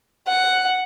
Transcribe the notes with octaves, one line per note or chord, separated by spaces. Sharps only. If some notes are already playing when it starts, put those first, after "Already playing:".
F#5